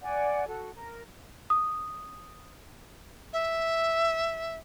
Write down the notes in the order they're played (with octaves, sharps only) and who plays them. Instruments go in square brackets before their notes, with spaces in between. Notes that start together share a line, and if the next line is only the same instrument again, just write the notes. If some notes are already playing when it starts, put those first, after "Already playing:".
[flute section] D5 F#5 G#5
F#4 A4
A#4
[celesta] D#6
[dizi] E5